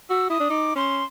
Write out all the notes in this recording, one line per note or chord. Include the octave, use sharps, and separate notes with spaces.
F#4 E6
E4 D#6
D4
D#4 D6
C#4 C6